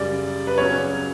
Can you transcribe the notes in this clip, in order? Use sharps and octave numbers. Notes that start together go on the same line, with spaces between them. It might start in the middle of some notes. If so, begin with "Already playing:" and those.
Already playing: F#2 C#3 G3 D5
B4
C#3 F#3 C#4 C#5